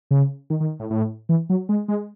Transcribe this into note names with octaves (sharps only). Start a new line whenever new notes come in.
C#3
D#3
D#3
A2
A2
E3
F#3
G#3
G#3